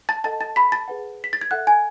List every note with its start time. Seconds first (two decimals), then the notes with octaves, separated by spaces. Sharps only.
0.09 A5 A6
0.24 A4 D#5 F#5 A5 A6
0.41 A5 A6
0.56 B5 B6
0.72 A5 A6
0.88 G#4 B4 F#5
1.24 B6
1.33 A6
1.41 G#6
1.51 A4 E5 F#5 F#6
1.67 G#5 G#6